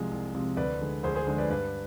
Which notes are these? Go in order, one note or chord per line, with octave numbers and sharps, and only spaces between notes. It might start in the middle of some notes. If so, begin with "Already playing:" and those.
Already playing: C2 C3 F3 G#3
C2
C3 F3 G#3
D2 B4 D5
D3 G#3
D2 G#4 C5
G#4 C5
D3 G#3
B4 D5
G2 B4 D5